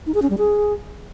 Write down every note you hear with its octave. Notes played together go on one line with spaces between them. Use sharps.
D#4
G#4
C#4
G3
G#4